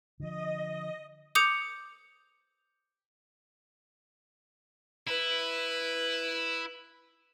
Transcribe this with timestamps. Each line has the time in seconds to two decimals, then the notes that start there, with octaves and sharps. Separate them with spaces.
0.20 D3 F3 D#5
1.35 D6 D#6 G6 C#7 F7
5.07 E4 B4